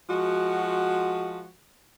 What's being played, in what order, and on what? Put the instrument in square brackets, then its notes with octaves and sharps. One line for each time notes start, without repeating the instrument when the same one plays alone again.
[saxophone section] F3 G#3 F#4